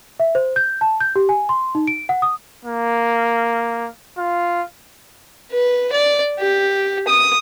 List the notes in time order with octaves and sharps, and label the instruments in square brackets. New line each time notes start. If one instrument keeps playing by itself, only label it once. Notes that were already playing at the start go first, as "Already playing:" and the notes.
[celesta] E5
C5
G6
A5
G6
G4
G#5
C6
D#4
D7
F#5
D#6
[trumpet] A#3
F4
[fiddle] B4
D5
G4
D#6